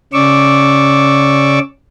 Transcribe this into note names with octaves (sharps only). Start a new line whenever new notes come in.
C#3 C#4 D5 C#6 D6 E6